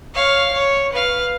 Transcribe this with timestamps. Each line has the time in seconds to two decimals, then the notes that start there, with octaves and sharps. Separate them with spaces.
0.14 C#5 F5
0.53 C#5
0.92 B4 F5